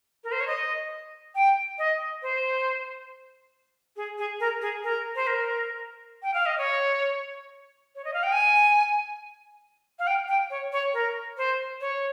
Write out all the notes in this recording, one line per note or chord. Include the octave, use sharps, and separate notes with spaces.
A#4
C5
C#5
D#5
G5
D#5
C5
G#4
G#4
A#4
G#4
A#4
C5
A#4
G5
F5
D#5
C#5
C#5
D#5
F5
G5
G#5
F5
G5
G5
C#5
C#5
A#4
C5
C#5